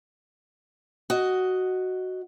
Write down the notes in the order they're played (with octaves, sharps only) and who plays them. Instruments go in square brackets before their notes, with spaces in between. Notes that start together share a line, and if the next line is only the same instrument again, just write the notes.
[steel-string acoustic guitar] F#4 D#5